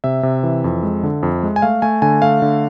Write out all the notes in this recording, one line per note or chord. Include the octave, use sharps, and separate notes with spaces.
C3 E5
C3
E3
F2
G#3
D3
F2
G#3
G#5
A3 F5
A3 G#5
D3 G#5
A3 F5
D3